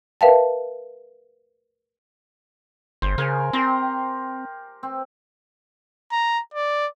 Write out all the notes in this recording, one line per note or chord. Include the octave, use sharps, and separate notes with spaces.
A#4 B4 E5 F5 G5 A5
G1 C5
C#3 A#4 G#5
C4 G4 A#5 C6
C4
A#5
D5